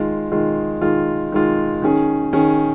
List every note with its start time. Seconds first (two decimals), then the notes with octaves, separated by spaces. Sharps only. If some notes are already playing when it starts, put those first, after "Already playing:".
Already playing: D#3 G#3 F4
0.32 D#3 G#3 F4
0.82 D#3 G#3 F4
1.32 D#3 G#3 F4
1.82 D#3 C#4 G#4
2.33 D#3 C#4 G#4